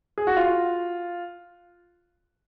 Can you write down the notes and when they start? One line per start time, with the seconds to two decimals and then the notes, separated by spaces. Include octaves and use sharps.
0.18 G#4
0.27 F#4
0.36 F4